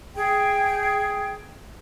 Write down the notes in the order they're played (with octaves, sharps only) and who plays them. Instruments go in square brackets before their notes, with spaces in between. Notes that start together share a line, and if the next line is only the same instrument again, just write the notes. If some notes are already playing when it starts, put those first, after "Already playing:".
[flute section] G#4 G5